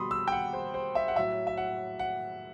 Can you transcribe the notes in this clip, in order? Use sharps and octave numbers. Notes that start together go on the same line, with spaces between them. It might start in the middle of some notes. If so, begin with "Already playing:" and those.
Already playing: B2 G3 B5 C6 D#6
E6
G5
F#5
C5
C5
E5
F#5
A2 F#3 E5
E5
F#5
F#5